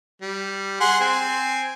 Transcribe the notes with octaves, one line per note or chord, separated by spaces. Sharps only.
G3
G#4 F#5 C6
C4 G#5